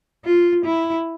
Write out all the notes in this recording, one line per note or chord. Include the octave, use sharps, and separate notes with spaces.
F4
E4